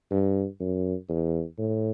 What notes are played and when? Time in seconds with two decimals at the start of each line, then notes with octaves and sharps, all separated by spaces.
0.11 G2
0.60 F#2
1.09 E2
1.58 A2